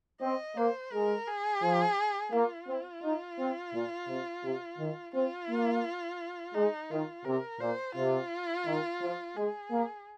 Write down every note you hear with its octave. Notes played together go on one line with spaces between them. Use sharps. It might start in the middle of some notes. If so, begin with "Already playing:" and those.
C4 D#5
A#3 C5
G#3 A#4
G#4
F3
A#3 F4
C4
D#4
C4
A#2
C3
C3
D#3
C4 F4
A#3
G#3 D#4
D#3 F4
C3 A#4
A#2 C5
C3 F4
D#3
F3
G#3 G#4
A#3